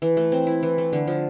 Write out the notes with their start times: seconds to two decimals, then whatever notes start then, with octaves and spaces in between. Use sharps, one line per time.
0.02 E3
0.17 A3
0.32 C4
0.47 E4
0.63 E3
0.78 A3
0.93 D3
1.07 F3